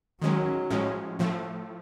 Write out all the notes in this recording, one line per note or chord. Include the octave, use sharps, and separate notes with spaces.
D#3 F#3 G#3 C#4
A2 F3 G#3 C#4
A2 F3 A3